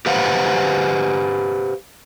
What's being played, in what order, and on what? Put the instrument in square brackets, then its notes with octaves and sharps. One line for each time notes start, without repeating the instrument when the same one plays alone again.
[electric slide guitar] G4 B4 C5 F5 F#5